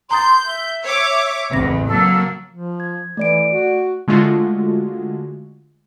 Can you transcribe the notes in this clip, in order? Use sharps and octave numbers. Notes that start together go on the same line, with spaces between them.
A#5 C6 D#6 G6 A6
E5
C#5 D6
A1 E2 C#3 C4 A#6
F#3 A#3 A4
F3
G#6
E3 A3 D5 D7
F#4
D3 G#3 A3 F4 F#4